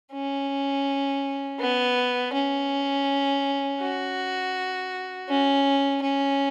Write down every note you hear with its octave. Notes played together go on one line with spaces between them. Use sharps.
C#4
B3
C#4
F#4
C#4
C#4